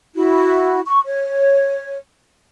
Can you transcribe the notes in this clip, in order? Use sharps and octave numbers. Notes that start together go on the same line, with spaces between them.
E4 F#4
C#6
C#5